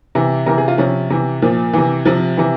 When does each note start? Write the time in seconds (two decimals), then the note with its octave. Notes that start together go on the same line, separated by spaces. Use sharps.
0.15 C3 E3
0.46 C3 E3 A#4
0.58 G#4
0.68 F4
0.78 C3 F3 C#4
1.10 C3 E3
1.42 A#2 F3
1.73 C3 E3
2.05 C3 F3 C4
2.37 C3 E3